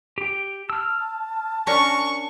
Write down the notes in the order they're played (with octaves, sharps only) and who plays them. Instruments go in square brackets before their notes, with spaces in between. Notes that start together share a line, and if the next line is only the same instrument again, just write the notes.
[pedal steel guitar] G4 G5
[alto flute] A5 [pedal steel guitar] E6 F6
[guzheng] C#4 D4 A#4 [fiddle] C#6